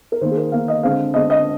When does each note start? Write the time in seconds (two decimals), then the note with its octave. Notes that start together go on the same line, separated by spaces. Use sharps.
0.12 A#4
0.21 D#3 A#3 C5
0.31 G#4
0.37 A#4
0.52 D#3 A#3 F5
0.68 D#5
0.83 D3 G#3 C4 F5
1.14 D3 G#3 C4 D#5
1.30 D#5